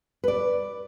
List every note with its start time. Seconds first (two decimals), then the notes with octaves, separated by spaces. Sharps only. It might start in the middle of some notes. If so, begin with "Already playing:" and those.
0.24 B4 D5